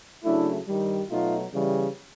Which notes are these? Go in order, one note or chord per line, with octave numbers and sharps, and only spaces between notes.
C#3 F#3 A3 D4 E4
G2 D#3 G3
B2 F#3 A3 D#4 F4
C#3 E3 G3